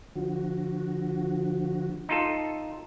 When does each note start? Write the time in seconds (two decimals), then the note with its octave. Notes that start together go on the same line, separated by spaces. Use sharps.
0.15 D3 F3 F#4
2.09 D#4 F4 A4